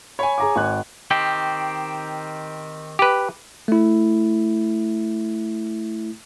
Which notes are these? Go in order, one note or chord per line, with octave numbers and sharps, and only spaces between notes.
C#5 G#5 B5
G#4 A#5 D6
G#1 F#6
D#3 C4 G4
G4 B4
A3 E4